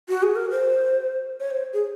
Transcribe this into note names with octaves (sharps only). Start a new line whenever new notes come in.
F#4
G#4
A#4
C5
C#5
C5
G#4